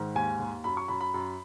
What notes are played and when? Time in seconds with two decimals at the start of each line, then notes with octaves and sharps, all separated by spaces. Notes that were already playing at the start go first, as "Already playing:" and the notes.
Already playing: G#2 D#3
0.15 D#2 G#5
0.40 D#2
0.64 F#2 B5
0.77 C#6
0.88 F#2 B5
1.01 B5
1.14 F#2